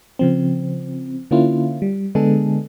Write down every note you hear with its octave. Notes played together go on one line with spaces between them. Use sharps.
C#3 F3 C4
D3 A#3 C#4 E4 F4
G3
D3 G#3 B3 D4 G#4 A4